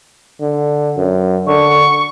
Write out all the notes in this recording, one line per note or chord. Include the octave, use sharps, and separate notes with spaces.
D3
F#2
D3 C#6